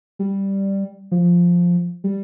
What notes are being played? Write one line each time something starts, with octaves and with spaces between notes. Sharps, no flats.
G3
F3
G3